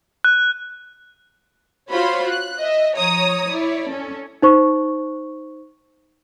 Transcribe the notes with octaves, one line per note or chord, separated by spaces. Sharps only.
F#6
F4 F#4 C5 C#5 B5 C6
F#6
D#5 E5
F3 C#5 A#5 D#6
E4 C#5 D5
C#4 A4
D#4 C5 C#6